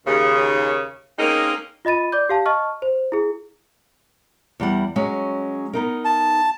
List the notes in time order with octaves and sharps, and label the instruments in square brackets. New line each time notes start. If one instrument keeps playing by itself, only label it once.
[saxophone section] D#2 C#3
G#3 A#3 C4 C#4 D#4 A#4
[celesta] F4 D#5 B5 A6 D#7
D5 D6 G6
G4 F5 A5
D#5 A5 C#6 F6
C5
E4 G#4
[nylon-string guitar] E2 G3 F#5
F#3 G#3 C#4
B3 D#4 A#4
[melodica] A5